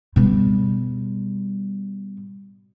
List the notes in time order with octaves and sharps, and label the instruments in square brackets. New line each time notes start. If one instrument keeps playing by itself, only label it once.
[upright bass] B2 G3